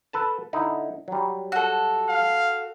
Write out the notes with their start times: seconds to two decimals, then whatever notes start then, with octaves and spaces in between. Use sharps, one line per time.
0.13 A4 B4 A5
0.53 D3 D#4 E4
1.08 F#3 G3
1.52 F#4 A4
2.09 F5